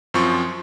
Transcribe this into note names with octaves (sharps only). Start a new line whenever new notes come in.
F#2 F3 C4 F4 C#6